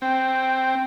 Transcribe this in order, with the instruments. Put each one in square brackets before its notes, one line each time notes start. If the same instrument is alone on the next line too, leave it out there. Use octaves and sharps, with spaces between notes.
[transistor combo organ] C4 [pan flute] G5